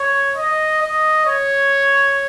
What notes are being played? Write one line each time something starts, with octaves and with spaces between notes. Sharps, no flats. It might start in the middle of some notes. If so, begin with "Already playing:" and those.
Already playing: C#5
D#5
D#5
C#5